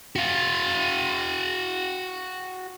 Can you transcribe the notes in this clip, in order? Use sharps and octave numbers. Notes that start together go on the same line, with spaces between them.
F#4 F5